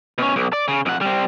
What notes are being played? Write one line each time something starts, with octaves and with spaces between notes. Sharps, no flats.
B2 C#4
B1
D5
C#3
F2 F#5
G3 C4